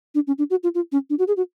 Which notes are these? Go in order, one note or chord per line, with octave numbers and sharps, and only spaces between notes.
D4
C#4
D4
F#4
F4
F4
C#4
D4
F#4
G#4
F#4